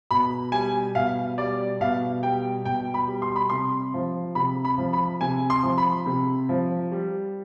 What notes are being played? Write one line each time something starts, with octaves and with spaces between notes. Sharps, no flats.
B2 B5
G3 G#5
B2 F5
G3 D5
B2 F5
G3 G5
B2 G5
B5
G3
C6
B5
C3 C6
F3
C3 B5
B5
F3
B5
C3 G#5
C6
F3
B5
C3
F3
G3